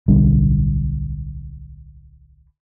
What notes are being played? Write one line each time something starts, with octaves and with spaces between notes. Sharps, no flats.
D1 B1 D3 G3